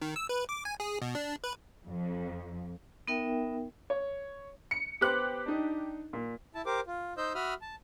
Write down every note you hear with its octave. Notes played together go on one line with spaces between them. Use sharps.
D#3
E6
B4
D6
G#5
G#4
B2
D4
B4
F2
B3 D#4 A#4 E5 G5
C#5
C#7
B3 G4 C5 F#6
D4 D#4
A#2
E4 A5
G4 A#4 C5 D6
F4
D#4 C5 D#5 E6 G6
F#4 E5 B5 D#6 F6
A5